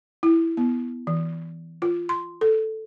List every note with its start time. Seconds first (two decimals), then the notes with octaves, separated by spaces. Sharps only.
0.23 E4
0.57 B3
1.07 E3
1.82 F4
2.09 C6
2.41 A4